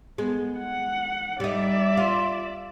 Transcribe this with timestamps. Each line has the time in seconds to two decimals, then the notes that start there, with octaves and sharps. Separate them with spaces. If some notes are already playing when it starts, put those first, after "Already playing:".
0.18 G#3 B3
0.58 F#5
1.40 G3 D#4 D5 E5
1.97 F4